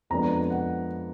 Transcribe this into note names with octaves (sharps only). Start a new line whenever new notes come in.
F2 F3 G#3 B3 D4 A#5
F#5